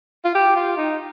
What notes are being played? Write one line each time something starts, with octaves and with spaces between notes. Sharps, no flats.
F4
G4
F4
D#4